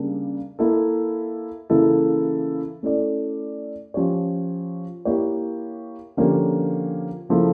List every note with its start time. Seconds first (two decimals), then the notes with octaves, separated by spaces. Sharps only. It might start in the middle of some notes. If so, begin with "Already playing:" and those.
Already playing: C#3 G3 A#3 D4
0.59 A#3 E4 A4
1.70 C#3 E3 A#3 E4 A4
2.83 A3 C#4 E4 A4 D5
3.94 F3 C#4 G4 C#5
5.05 A#3 E4 G4 C#5
6.17 D3 F3 A#3 C#4 G4
7.29 C#3 F3 A#3 E4 A4